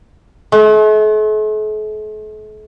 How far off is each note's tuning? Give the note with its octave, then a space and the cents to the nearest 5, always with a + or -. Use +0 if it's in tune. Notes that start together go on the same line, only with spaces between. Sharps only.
A3 -45